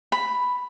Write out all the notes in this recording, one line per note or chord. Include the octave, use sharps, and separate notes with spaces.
B5